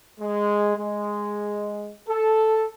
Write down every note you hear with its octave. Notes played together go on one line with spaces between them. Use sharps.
G#3
G#3
A4